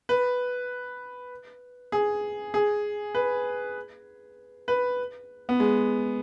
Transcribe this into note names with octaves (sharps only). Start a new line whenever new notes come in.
B4
G#4
G#4
B4
B4
B3
G#3